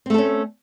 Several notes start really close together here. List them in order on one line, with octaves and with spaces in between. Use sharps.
C4 A3 A4 C#4